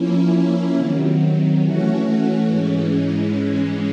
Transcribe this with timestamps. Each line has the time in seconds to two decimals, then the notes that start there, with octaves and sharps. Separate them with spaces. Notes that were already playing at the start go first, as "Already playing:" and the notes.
Already playing: F3 A#3 C#4 E4
0.75 C3 D#3 F#3
1.62 E3 A3 C#4 F#4
2.48 G#2 E3 G#3 C#4